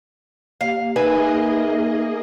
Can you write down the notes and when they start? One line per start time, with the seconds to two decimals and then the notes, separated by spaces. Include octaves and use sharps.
0.61 A#3 G4 F5
0.96 A#3 D#4 G#4 B4 D#5 E5 G#5